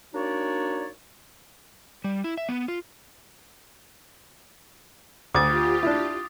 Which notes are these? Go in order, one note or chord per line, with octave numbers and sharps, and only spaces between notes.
A#3 D4 D#4 F#4 C#5 D5
G3
E4
E5
B3
F4
D2 F4 G4 D6 D#6 A6
D4 E4